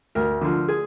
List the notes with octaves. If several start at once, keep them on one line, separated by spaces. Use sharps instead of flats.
D2 A#4
D3 F3
G#4